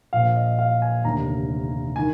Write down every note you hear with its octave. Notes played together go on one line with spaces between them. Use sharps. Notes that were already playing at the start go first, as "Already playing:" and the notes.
A#1 A#2 F3 F5
D#5
F5
G#5
F1 D#2 D3 A#5
D#3 G#5